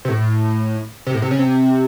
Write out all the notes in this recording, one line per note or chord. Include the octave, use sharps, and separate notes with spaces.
C3
A2
C3
A2
C3
C#3
C3